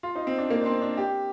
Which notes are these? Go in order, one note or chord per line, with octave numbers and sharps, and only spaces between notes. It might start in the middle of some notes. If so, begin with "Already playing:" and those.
F4
D#4
C4
D4
A#3
D4
C4
D4
G4